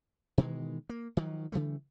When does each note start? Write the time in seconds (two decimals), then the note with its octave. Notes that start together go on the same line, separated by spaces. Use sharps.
0.38 B2 D#3 E3 G#3
0.89 A#3
1.17 D#3 F3 F#3
1.52 C#3 E3 G3 A3